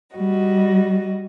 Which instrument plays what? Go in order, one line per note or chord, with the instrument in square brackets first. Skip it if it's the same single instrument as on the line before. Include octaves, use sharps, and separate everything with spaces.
[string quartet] G3 F#4 D#5